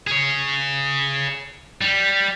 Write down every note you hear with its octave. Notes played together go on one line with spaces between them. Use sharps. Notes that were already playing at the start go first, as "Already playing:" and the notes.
G#4 C#5
G3